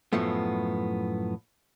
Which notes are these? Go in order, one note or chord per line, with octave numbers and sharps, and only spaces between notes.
F#2 A2 F3 A3 B3